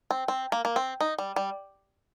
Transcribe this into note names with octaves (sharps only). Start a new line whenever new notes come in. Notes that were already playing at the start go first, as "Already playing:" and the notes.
C4
C4
A#3
A#3
C4
D#4
G3
G3